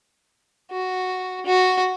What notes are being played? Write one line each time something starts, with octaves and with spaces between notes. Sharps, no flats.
F#4
F#4